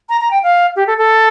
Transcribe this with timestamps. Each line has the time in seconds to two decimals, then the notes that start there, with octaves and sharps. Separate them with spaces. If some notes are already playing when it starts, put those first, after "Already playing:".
0.09 A#5
0.21 A#5
0.31 G5
0.43 F5
0.76 G4
0.87 A4
0.98 A4